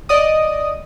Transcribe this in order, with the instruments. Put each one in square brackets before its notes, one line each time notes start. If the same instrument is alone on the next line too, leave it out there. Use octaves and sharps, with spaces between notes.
[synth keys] D5 D#5 D#6